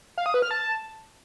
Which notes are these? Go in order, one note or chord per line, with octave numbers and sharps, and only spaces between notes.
F5
D#6
B4
F6
A5